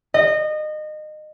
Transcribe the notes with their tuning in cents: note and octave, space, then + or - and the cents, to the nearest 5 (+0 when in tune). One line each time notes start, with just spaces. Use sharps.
D#5 -25